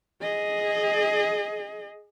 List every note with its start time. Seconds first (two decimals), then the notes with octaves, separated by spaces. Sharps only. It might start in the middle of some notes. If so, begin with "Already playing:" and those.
0.22 G#4 D#5